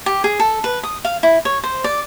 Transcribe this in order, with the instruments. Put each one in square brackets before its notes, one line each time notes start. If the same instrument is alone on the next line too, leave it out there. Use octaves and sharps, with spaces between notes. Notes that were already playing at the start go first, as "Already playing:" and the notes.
[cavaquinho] G4
G#4
A4
B4
D#6
F5
E4
C#5
C5
D5